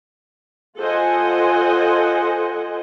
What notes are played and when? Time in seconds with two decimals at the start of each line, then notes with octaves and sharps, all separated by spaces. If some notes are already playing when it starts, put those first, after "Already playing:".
0.79 F4 A4 C5 D#5 F#5 G#5